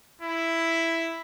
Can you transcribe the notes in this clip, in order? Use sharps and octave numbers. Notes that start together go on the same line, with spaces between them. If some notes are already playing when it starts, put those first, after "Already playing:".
E4